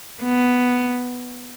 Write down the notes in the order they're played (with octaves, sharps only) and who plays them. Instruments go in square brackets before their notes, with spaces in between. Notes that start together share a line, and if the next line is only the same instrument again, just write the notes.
[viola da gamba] B3